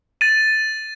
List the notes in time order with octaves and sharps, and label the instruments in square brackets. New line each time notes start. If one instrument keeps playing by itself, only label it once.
[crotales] A6 D#7